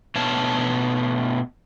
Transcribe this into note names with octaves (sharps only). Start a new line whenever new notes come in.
B2 A3 C#5 F5 A5